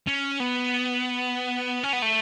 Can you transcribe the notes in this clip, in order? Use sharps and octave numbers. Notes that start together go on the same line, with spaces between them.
C#4
B3
C#4
B3
A3